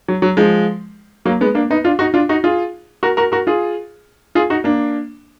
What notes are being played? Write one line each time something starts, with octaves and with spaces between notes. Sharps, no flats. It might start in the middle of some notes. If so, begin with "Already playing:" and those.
F#3
F#3
F3 G#3
F#3 A#3
G#3 B3
A#3 D4
B3 D#4
D4 F4
D#4 F#4
D4 F4
D#4 F#4
F4 G#4
F#4 A#4
F#4 A#4
F#4 A#4
F4 G#4
F4 G#4
D#4 F#4
A#3 D4